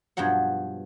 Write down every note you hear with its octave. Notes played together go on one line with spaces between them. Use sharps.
G2 B2 F3 F#3 F#5